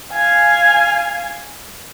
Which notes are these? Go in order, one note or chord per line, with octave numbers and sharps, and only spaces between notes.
F5 G#5